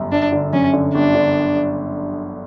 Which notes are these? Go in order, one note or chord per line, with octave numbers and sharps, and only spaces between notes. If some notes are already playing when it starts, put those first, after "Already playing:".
Already playing: G1 F#2
G1 D4
D3
F#2 C#4
D3
G1 D4
D3